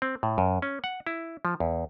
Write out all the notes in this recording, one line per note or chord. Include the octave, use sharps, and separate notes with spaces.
C4
A2
F#2
C#4
F#5
E4
F3
E2